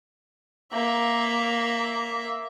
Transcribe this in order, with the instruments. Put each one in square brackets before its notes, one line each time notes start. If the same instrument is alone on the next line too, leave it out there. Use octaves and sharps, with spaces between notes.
[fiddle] A#3 E5